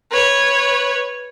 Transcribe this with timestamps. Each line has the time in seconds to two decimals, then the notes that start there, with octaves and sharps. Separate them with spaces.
0.10 B4 C#5